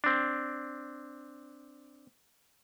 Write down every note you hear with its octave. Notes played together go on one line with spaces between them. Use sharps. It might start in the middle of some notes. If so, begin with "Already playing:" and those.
C4 D4